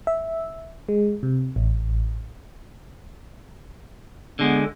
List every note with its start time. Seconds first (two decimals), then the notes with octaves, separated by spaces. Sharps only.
0.07 E5
0.89 G#3
1.23 C3
1.56 A1
4.39 D3 G#3 B3